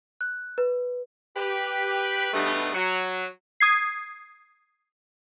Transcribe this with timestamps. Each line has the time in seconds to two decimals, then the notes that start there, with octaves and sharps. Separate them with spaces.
0.21 F#6
0.58 B4
1.36 G4 B4
2.32 G2 B2 G3 A3 B3 D#4
2.73 F#3
3.60 D#6 G#6 C7